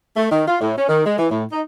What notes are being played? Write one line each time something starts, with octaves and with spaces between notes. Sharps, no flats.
A3
D#3
F4
A2
C#4
D#3
G#3
E3
A2
D#4